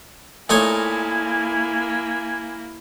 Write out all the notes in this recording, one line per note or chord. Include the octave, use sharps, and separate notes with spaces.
A#2 A3 A#3 D#4 E4 C#5 G#5